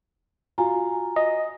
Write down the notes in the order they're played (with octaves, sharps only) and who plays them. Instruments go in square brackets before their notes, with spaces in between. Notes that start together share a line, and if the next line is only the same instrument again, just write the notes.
[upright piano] F4 [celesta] F#4 G#5 A#5
[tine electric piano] D#5